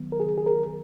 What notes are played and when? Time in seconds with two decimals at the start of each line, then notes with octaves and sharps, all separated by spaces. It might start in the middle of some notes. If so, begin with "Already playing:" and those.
Already playing: D#3 F#3 B3
0.12 A#4
0.20 G#4
0.38 G#4
0.46 A#4